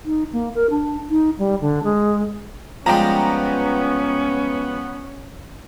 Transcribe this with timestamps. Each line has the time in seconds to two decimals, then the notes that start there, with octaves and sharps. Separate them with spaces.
0.05 D#4
0.33 A#3
0.55 A#4
0.70 D4
1.10 D#4
1.38 G3
1.61 D3
1.83 G#3
2.86 F3 G3 G#3 B3 C#4 G5 A#5